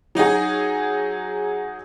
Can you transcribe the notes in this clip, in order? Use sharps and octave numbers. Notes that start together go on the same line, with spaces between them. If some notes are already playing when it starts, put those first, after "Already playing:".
F#3 D#4 F#4 G#4